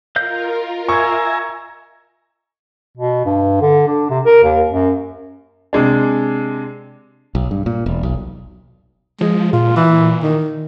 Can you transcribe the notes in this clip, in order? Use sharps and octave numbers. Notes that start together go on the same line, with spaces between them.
F4 A#4 D#5 F5 G6
E5 G#5 A#5 C#6 G#6
B2
G2
D3
D4
C3
A#4
D#2
F#2
C3 G#3 D4
B1
G2
A#2
E1
B1
F3 G#3
A#2 F4
E3
D#3